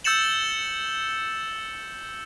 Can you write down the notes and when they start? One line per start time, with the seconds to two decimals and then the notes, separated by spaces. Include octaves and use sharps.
0.04 E6 G6 A6 C#7 E7 F#7